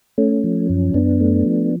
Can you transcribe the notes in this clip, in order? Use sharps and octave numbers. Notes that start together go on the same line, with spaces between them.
A3 C#4
F3
F#2
F#2 B3 D4
A3
F3